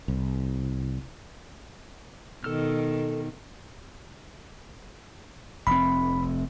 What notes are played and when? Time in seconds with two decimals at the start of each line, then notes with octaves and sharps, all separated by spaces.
0.08 C2
2.44 B2 D#3 A4 E6 F6
5.67 F1 C4 B5